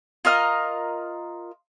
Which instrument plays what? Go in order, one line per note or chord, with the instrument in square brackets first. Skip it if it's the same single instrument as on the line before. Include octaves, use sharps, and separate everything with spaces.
[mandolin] F4 A#4 D#5 F6